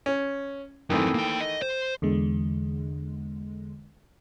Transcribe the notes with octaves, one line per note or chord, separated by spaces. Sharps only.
C#4
F#2 D#3 E3 A3 C4
A#3 G5
D#5
C5
E2 D3 G#3